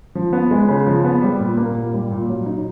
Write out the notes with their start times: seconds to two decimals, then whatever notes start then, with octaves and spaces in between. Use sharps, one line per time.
0.15 F3
0.33 B3
0.51 G#3
0.68 C#3
0.87 F3
1.04 B3
1.22 G3
1.40 A#2
1.57 A#3
1.75 A#2
1.93 G3
2.11 A#2
2.28 F#3
2.46 D#4